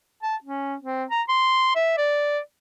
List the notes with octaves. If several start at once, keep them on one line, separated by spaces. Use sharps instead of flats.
A5
C#4
C4
A#5
C6
E5
D5